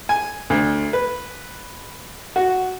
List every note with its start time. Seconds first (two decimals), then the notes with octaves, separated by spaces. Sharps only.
0.09 G#5
0.50 D2
0.93 B4
2.36 F#4